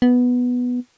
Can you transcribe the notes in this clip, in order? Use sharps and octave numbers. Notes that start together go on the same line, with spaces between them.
B3